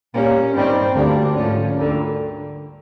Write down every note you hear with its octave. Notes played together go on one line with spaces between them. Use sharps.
A#2 G3 A#3 C#4
G2 D#3 G3 C4
D2 D3 G3 A#3 D4
G#2 F3 A3 C#4
D2 D3 G3 A#3